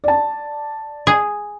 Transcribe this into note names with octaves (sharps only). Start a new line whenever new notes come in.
D5 A5
G#4